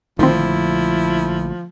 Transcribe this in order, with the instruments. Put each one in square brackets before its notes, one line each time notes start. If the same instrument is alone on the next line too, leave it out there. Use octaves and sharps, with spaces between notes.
[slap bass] A#1 D3 A3 [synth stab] D#3 C4 [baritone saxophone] F3 [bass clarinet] E4